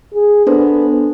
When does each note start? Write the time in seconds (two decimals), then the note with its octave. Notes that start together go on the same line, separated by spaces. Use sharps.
0.13 G#4
0.47 B3 D4 A4 C5